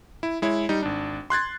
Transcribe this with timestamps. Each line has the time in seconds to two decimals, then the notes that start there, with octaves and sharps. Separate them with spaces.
0.23 E4
0.42 G#3 E4 C#5
0.69 G3 D#4
0.83 G#1 D4
1.30 C6 F#6 G#6 A6